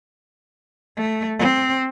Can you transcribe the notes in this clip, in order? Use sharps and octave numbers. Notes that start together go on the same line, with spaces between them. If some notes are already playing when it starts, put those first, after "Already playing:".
A3
C4